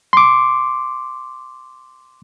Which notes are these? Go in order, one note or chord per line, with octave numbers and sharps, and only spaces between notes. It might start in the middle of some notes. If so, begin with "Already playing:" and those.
C6 D6